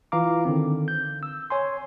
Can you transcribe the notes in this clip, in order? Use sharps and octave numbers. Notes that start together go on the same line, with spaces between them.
E3 F4 F5 A#5 D6
D3 D#3 C4
G6
E6
C#5 G#5 C6